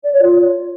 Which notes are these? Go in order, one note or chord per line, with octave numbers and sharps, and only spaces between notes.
D5
C#5
F4